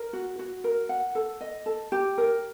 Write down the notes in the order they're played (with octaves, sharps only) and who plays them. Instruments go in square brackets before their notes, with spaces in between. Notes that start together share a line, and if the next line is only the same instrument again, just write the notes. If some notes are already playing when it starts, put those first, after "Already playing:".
Already playing: [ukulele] A#4
F#4
F#4
A#4
F#5
A4
D#5
A4
G4
A#4